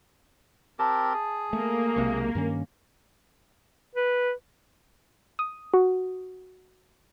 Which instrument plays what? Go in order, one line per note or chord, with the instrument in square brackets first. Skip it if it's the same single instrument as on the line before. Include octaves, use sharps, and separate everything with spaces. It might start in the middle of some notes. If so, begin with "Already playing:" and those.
[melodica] C4 G4 A#4 [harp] A5
[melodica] G#4
[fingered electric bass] A3 [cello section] A#3
[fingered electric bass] B1 C3 G#3 [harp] C#6
[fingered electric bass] G2 D#3 C#4
[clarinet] B4
[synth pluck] D#6
F#4